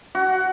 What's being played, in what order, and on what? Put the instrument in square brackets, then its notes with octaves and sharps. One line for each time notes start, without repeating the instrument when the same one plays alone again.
[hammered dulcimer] F#4